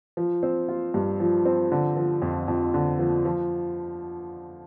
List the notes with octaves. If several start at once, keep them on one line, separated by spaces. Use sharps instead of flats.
F3
C4
F4
G2
F3
C4
D3
F3
F2
F2
D3
F3
F3